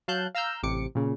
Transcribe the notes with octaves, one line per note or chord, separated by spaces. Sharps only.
F#3 F5 A5 F#6 G6
F5 A#5 E6 F6 G6
A1 C3 D6 C#7
A#2 C#3